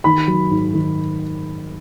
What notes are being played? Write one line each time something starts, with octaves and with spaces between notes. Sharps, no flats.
D#3 B5
F#3
G#2
D#3